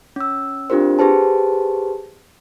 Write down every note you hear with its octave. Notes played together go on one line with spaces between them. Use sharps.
C#4 E6
C4 D4 F4 G4 A#4 C5
G4 G#4 B4 C5 A5